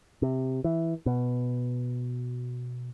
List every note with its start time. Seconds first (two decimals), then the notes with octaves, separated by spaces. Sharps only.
0.22 C3
0.64 E3
1.06 B2